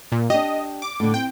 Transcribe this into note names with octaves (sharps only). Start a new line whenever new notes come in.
A#2
D4 G4 D#5
D6
A2 D3
C4 G5